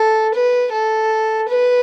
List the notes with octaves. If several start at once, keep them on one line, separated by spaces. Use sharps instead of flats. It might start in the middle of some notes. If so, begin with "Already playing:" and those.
Already playing: A4
B4
A4
B4